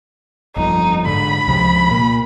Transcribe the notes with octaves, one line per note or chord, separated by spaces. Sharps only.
G1 F2 D#4
G#2 D3 B5
C#2 C3 F3
A#2 A#3